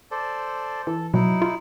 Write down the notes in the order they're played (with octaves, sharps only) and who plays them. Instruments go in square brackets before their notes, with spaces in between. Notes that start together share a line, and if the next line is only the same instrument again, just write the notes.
[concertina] A4 C5 D5
[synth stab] E3 [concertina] A4
[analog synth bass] B2 [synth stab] F#3 [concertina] D#4 E4
[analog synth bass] F4